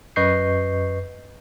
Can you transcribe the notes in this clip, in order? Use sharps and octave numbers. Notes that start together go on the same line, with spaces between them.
F#2 B4 D#5 C#6 G6 C7